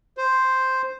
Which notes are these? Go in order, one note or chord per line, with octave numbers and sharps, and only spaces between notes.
C5